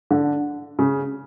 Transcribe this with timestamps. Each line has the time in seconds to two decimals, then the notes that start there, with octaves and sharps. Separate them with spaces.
0.11 D3
0.79 C#3